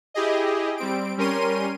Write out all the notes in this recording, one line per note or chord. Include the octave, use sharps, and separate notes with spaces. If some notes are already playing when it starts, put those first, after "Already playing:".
E4 G4 G#4 D#5
G3 C4 D7
G3 C#4 A#4 C6 D#7